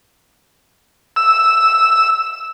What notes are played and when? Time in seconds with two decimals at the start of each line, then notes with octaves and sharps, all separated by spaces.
1.16 E6